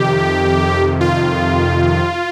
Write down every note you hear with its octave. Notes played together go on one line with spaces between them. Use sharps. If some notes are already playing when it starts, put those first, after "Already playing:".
Already playing: F2 C3 D#3 G4
F4